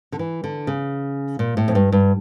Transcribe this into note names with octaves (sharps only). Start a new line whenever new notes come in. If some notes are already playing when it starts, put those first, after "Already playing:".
D3
E3
D3
C#3
A#2
A2
F2
G2
G2